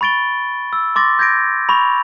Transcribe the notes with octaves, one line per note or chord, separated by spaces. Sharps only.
B5 C#6 A6 D7 G7
E6
C6 D6 A6 A#6
G6 G#6 A#6 D7
B5 C#6 F7